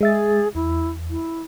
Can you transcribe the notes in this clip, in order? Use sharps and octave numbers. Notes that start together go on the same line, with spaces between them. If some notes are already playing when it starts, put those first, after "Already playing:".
G#3 G#4 E5 A6
E2 E4
E4